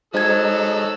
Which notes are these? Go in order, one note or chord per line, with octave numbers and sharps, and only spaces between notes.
F#3 G#3 D#4 A4 C5 E6 G#6